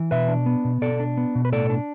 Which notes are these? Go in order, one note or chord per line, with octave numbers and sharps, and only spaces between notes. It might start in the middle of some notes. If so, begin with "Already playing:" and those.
Already playing: E3
B2 B4 E5
D4
B3
B2
B2 A4 D5
D4
B3
B2
B4
A2 A4 D5
D4